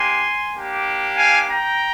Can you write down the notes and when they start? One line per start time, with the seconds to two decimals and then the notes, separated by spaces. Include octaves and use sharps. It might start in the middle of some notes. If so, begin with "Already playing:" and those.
Already playing: A#3 D4 G4 G#5 C6
0.52 A#3 D4 G4
1.17 F5 G#5
1.50 G5 A#5